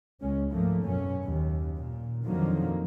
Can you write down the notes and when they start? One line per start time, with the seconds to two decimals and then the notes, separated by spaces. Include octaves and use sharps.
0.21 C#2 G#3 C#4
0.51 G#2 F3 A3 A#3
0.84 F#2 B2 C#4
1.24 D#2
1.76 A#2
2.25 F2 D3 D#3 F3 F#3 A#3